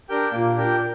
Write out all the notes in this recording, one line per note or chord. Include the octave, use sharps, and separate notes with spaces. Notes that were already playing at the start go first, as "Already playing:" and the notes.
D4 G4 A#4 G5
A#2 A#3
D4 G4 A#4 G5